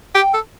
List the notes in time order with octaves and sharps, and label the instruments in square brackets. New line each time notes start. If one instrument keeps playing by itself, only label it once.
[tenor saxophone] G4 [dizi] G5
[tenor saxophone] A4